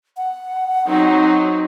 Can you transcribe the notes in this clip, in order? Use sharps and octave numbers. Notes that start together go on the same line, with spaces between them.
F#5
F#3 C4 D#4